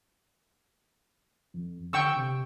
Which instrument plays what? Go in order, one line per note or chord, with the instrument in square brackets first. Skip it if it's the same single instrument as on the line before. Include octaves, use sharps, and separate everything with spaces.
[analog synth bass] F2
[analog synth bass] D3 [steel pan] G5 C#6 E6
[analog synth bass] C3